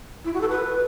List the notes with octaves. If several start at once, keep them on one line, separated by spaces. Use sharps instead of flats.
E4
F#4
A4
B4